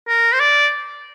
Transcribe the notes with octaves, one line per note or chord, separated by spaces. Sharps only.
A#4
C5
D5